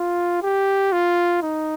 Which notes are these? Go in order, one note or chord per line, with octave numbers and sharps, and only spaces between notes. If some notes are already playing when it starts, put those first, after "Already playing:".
Already playing: F4
G4
F4
D#4